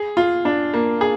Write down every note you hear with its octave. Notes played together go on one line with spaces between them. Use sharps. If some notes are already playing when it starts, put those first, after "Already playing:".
Already playing: G#4
F4
D4
A#3
G#4